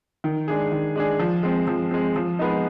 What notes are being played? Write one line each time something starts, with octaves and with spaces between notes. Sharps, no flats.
D#3
G#3 D4 G#4
D#3
G#3 D4 G#4
F3
G#3 C4
F3
G#3 C4
F3
G#3 B3 D#4